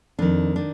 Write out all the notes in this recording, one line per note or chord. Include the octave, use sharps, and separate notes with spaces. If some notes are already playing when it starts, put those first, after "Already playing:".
F2 D#3 D4
D#3 D4